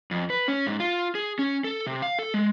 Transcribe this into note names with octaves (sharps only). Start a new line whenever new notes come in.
F2
B4
C#4
G#2
F4
G#4
C#4
A4
C3
F5
A4
G#3